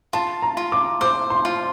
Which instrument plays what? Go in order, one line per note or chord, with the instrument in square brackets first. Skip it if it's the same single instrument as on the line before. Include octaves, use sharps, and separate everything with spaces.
[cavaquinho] F4 [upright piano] A5
[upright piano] A#5
[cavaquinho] F4
[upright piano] D6
[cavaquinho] C5 [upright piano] D6
[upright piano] C6
[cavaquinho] F4